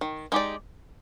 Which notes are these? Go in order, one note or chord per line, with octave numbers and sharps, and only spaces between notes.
D#3
G#3 D#4 G4 D5